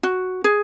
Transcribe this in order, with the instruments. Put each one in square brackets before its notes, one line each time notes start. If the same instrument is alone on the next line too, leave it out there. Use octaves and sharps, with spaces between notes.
[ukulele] F#4
G#4